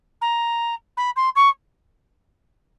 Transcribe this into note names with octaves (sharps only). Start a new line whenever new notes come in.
A#5
B5
C6
C#6